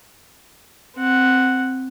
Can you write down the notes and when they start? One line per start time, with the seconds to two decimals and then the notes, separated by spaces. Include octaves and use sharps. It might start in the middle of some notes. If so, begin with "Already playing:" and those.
0.97 C4 F#5